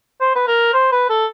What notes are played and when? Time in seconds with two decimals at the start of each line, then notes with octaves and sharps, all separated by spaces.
0.21 C5
0.35 B4
0.47 A#4
0.73 C5
0.92 B4
1.10 A4